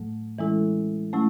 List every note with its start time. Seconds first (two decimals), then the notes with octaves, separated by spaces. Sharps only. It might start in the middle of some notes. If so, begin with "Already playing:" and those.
Already playing: A2 F#3 A3
0.39 E3 G#3 C#4 E4 A4
1.13 F#3 A3 C#4 E4